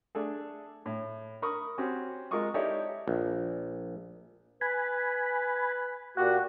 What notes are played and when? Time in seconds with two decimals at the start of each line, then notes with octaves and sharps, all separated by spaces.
0.15 A3 D4 G#4 A4
0.86 A2
1.42 A#4 B5 C#6 D#6
1.78 C4 C#4 F#4 G4
2.31 G#3 F4 A#4 D#5 C#6 D#6
2.54 D#4 E4 G4 A4 C#5 D5
3.08 A#1
4.61 B4 G#5 B5
6.17 A#2 A#3 F#4 G4 F#5